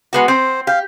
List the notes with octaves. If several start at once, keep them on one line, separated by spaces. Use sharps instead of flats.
G#3 B3 F#4
C4 C5
G4 F5